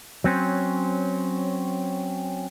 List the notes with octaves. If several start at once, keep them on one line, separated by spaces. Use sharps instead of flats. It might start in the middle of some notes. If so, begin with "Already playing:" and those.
F#3 C4 C#4 C5